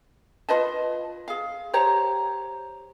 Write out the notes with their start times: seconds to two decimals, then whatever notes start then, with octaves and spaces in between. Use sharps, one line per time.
0.49 F4 B4 D#5 A5
1.28 G#4 F5
1.73 G4 C5 C#5 A#5